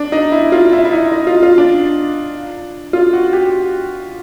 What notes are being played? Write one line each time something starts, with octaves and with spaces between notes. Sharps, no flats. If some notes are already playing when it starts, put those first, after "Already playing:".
Already playing: D4
D#4
E4
F4
E4
E4
D#4
D#4
F4
F4
D4
F4
F#4
G4